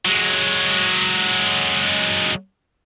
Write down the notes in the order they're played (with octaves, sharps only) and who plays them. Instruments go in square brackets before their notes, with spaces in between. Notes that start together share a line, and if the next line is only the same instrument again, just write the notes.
[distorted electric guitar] F#3 G#3